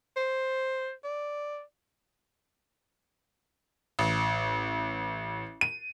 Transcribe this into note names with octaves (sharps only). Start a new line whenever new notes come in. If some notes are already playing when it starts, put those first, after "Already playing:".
C5
D5
A1
D#7